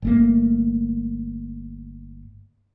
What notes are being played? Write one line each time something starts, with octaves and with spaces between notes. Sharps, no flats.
G1 A3 A#3